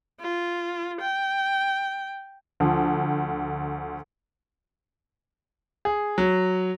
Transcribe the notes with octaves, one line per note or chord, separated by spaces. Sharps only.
F4
G5
D2 F3
G#4
F#3